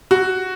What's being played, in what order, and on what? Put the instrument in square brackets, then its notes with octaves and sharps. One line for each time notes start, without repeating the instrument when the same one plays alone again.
[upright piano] F#4